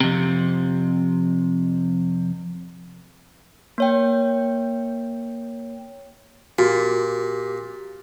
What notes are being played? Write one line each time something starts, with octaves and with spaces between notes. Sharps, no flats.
F2 C3
A#3 C#5 G5
A#2 F#4 G4